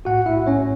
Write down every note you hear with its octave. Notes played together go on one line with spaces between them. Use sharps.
B1 A2 A3 F#4 F#5
E4 E5
C#4 C#5